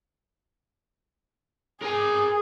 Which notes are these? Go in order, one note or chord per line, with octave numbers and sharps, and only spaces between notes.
G#4 A#4 G#5